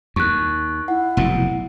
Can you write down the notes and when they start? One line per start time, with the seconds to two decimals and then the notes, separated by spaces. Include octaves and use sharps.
0.16 D#2 C#6 F#6
0.88 E4 F#5
1.17 F1 B1 A2